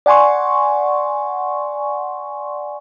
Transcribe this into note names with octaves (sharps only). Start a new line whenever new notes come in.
D5 F#5 G#5 C6 C#6